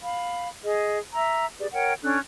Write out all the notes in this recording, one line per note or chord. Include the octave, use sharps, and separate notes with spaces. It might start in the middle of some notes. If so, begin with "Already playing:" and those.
F5 B5
G#4 D#5
E5 A#5 E6
G4 G#4 B4 D5
A#4 C#5 F#5 G5
C#4 D4 A4 F#6